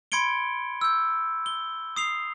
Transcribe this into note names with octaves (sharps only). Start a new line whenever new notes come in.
B5 C6 G#6 C#7 D7 G7
E6 G6
G7
D#6 C7 F7